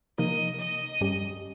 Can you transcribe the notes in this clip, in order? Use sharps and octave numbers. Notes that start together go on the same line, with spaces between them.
C3 F3 A#3 D#4 A#4 D#5
D#5
G2 G3 C#4 G4